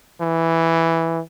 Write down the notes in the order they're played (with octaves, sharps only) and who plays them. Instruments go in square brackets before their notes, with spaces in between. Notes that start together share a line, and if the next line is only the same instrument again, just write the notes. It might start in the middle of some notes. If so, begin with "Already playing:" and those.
[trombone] E3